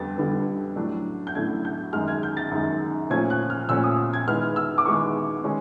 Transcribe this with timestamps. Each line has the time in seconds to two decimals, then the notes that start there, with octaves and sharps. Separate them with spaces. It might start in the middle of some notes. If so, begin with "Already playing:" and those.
Already playing: F2 D3 G3 B3 A6
0.18 F2 D3 G3 B3
0.76 A2 F#3 A3 D4
1.27 G6
1.35 A2 F#3 A3 D4 G#6
1.65 G6
1.93 F#2 D#3 G#3 F6
2.08 G#6
2.23 G6
2.37 A6
2.51 F#2 D#3 G#3
3.10 A#2 F3 A3 C#4 G#6
3.30 F#6
3.50 F6
3.69 A#2 F3 A3 C#4 E6
3.84 D#6
4.14 G#6
4.28 D#3 G#3 B3 E4 F6
4.56 E6
4.78 D6
4.86 D#3 G#3 B3 E4 C#6
5.44 D#3 G#3 C#4